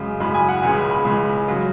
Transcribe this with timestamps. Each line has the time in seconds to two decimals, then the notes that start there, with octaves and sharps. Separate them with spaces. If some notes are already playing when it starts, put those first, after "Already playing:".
Already playing: F#2 C#3 G#3
0.20 F#2 C#3 G#3 B5
0.34 G#5
0.48 F#5
0.62 C#2 C#3 G#3 G#5
0.77 B5
0.91 B5
1.05 C#2 C#3 G#3
1.48 C#3 F#3